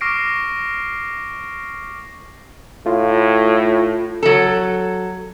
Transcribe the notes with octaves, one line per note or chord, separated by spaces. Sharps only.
C#6 D6 F6 A#6 C7 D7
A2 F4
F#3 A4